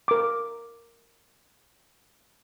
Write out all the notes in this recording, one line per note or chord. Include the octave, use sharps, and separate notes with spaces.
A#4 D6